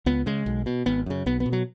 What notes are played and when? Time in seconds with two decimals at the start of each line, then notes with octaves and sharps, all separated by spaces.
0.06 C#2 B3
0.26 C#3 G#3
0.46 B1
0.66 B2
0.86 G#1 B3
1.06 F#2 C#3
1.26 B1 B3
1.40 B3
1.46 B2
1.53 F#3